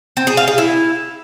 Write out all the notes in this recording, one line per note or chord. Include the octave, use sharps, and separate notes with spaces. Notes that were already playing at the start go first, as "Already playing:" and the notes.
C4
G#4
F5
G#4
E4